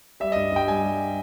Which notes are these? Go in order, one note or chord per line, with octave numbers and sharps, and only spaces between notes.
G3 E5
G2 D#5
G2 G5
G3 G#5
G3